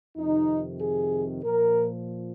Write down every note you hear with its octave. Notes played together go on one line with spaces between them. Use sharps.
F2 C3 D#3 D#4
G#4
A#2 F3 A#4